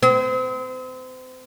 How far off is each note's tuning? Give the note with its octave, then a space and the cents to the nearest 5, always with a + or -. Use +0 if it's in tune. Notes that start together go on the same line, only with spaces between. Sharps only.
C4 -35